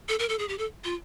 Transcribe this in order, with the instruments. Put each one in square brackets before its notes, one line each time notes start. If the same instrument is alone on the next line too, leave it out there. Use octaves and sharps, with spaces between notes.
[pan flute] A4
A#4
A4
G#4
G4
A4
F4